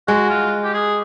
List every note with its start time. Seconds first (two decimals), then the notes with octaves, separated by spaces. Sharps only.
0.08 G#3 F#4
0.30 F4
0.64 G4
0.74 G#4